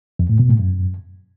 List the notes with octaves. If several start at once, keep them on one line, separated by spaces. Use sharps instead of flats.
F2
A2
B2
A2
F#2